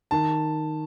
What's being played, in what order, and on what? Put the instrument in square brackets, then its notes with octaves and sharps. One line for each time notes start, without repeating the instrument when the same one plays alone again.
[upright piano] D#3 [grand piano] A5